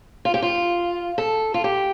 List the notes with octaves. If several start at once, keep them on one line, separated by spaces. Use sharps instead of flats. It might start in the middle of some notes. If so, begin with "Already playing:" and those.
F4
G4
F4
A4
F4
G4